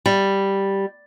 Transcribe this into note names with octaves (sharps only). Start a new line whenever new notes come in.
G3